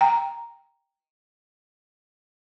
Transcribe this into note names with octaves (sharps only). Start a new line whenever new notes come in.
G5 A#5